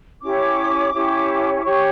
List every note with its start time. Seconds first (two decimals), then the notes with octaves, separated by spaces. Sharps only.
0.22 C#4 E4 G4 C#5 D6
0.93 C#4 E4 G4 C#5
1.60 D6
1.65 C#4 G4 C#5 C#6